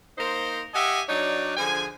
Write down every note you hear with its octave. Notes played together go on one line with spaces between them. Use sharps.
A#3 D#4 A#4 C5
G4 D#5 E5 F#5 G#5
F#3 D4 D#4 C#5 D5
D3 F3 G#4 G#5